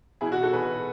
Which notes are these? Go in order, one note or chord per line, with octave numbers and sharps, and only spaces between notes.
B2 E4 G#4
F#4
F#4 A4
B2 G#4 B4